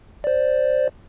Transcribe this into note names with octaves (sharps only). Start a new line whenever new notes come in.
C5 D5